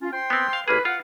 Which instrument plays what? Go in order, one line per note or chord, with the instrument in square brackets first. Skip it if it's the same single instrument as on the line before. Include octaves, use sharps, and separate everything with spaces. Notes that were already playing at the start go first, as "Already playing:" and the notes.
[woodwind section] C#4 F4
C5 G5 C6
[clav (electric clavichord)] B3 C4
F5
[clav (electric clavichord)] A1 A#3 G#4 [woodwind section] B4
[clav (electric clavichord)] F4 [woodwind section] F#5